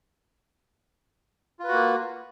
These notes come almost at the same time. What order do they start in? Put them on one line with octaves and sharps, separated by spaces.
F4 B4 F#4 A#3